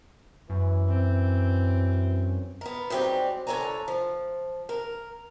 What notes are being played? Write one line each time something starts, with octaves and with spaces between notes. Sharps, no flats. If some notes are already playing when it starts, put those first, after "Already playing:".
F#2 E3
C4
B3 A#4
G#2 F#3 G3 C4 G4
F2 D3 A4 C#5 G#5 A#5
F3
A#4